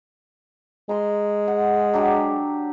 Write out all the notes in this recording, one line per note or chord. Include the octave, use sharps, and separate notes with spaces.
G#3 A#5 C6
F#5
F#3 D4 G4